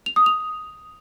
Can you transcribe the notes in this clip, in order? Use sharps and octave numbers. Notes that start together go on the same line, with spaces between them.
F7
D#6
F7